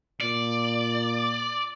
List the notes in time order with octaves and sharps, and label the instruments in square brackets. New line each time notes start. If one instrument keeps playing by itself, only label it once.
[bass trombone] A#2 [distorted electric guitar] D5